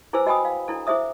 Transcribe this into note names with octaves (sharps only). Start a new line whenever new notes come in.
E4 G#4 B4 C5 G#5 E6
F#4 D#5 G5 G#5 B5 D#6
F5
D4 E4 A4
E4 G#4 C5 E5 D#6